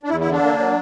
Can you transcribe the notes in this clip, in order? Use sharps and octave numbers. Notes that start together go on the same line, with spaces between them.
D4
E2 E4
E4
D3
D4
A#3
F#3